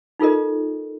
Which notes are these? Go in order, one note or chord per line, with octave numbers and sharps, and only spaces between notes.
D#4 F4 A4 A#4 D#5